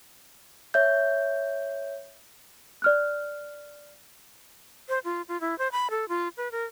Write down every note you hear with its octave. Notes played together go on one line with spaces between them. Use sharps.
C#5 E5 G6
D5 F6 F#6
C5
F4
F4
E4
C5
B5
A4
F4
B4
A#4